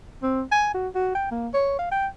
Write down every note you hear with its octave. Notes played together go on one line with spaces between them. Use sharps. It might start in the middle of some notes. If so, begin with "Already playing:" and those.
C4
G#5
F#4
F#4
G5
A#3
C#5
F5
G5